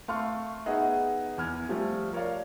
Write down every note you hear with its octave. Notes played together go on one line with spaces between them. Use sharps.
A3 F5 C6 C#6 F6
B3 D#4 G#4 D#5 E5 F#5
E2 F6 G#6
F3 G3 A3
A#4 C#5 D5 F5